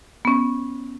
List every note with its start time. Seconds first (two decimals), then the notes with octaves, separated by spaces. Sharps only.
0.25 B3 C#4